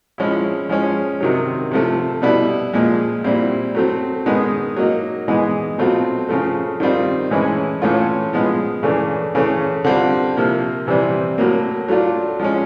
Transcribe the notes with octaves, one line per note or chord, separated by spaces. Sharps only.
F3 G#3 C#4 E4
F3 G#3 C#4
C3 D#3 F#3
C3 F3 A3
B2 G3 B3 E4
A#2 F3 G#3
A#2 G3 C4 E4
F#3 A3 C4
D#3 G#3 B3 D#4
F#3 A#3 D#4
E3 G#3 B3 D#4
B2 F#3 A3 C4 F4
C#3 F3 A3
D#3 G3 C4 F4
A2 E3 G#3 C#4 E4
A2 E3 A3 C#4 F4
F3 G#3 B3
C#3 E3 A3 D4
C#3 E3 A3 C#4
D3 G3 C4 F4
C3 F3 A#3
C3 E3 G3 C4
A2 F#3 A#3
F#3 A3 D4 F4
F3 G#3 C#4